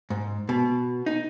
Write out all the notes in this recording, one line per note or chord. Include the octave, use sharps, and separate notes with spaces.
G#2
B2
D#4